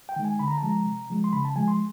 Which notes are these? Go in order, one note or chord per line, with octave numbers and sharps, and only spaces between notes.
G5
D#3 G#3
G#5
D3 B5
A#5
A5
F3 G#3 A#5
C3
F3 G#3
C6
C#3 B5
A5
F3 G#3 G#5
C6